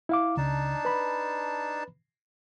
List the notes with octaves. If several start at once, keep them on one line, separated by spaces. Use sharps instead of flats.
E4 F5 D6
C#2 C#3 D4 D#4 A5
B4 B5